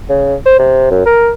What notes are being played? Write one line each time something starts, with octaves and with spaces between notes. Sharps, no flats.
C#3
C5
C3
F#2
A#4